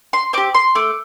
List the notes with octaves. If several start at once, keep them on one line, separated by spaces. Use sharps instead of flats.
C6
C4 G4 D6
C6
A3 D6